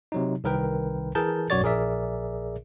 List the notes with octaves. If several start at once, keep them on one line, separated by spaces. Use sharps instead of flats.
C3 F#3 D#4
C2 D#3 A#4 B4 G5
E3 G#4 A#4 A5 G6
B1 F#2 F#4 C#5 D5 A6
A#1 G#4 A#4 D5 E5